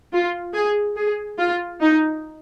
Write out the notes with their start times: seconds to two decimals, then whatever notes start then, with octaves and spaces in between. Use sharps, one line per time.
0.12 F4
0.53 G#4
0.96 G#4
1.37 F4
1.81 D#4